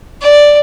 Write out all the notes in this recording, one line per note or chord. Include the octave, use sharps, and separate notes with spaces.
D5